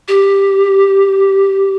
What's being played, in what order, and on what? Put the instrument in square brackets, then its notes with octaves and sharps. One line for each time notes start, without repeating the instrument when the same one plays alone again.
[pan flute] G4